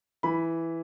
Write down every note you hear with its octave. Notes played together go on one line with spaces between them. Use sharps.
E3 B5